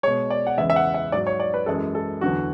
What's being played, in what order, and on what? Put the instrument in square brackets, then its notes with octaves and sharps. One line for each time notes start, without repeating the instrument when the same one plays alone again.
[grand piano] G#3 C#5
B2
D5
F#5
E2 C#3 E3 G#3 E5
E5
F#5
E5
G#2 F#3 D5
C#5
D5
B4
F#2 E3 G#3 A4
A4
E2 D3 F#3 F#4